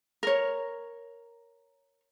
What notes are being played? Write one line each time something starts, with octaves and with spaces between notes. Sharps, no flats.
A#4 C#5